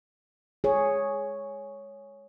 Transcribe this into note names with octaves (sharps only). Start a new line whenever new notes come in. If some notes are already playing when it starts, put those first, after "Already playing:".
G#4 C#5